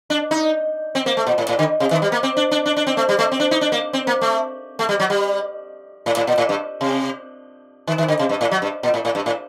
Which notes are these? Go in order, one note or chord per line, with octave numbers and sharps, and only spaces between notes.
D4
D#4
C4
A#3
A3
A#2
A2
A2
D3
C3
D#3
G3
A#3
C4
D4
D4
D4
D4
C4
A3
G3
A3
C4
D4
D#4
D4
A#3
C4
A#3
A3
A3
G3
F#3
G3
A2
A2
A#2
A2
G2
C3
D#3
D#3
D3
C3
G2
A2
F#3
G2
A#2
A2
A2
G2
A2